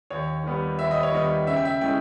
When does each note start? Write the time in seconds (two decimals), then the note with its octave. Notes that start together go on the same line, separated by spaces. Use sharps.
0.10 D#2 C#5
0.44 D#3 G3 B3
0.79 D#2 E5
0.91 D#5
1.03 C#5
1.12 D#3 G3 B3 D#5
1.46 C#3 E5
1.56 G5
1.65 E5
1.81 G#3 C#4 E4 G5